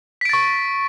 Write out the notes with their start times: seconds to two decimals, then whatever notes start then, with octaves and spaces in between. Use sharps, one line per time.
0.21 B6
0.25 D7
0.29 A6
0.33 C#6